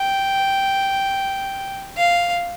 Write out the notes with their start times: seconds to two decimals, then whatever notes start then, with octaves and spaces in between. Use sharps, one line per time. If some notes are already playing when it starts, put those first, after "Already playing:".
Already playing: G5
1.97 F5